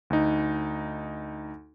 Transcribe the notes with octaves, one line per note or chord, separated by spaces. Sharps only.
D2 D#4